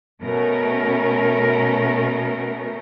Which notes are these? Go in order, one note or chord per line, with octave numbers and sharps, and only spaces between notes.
B2 A3 C#4 A#4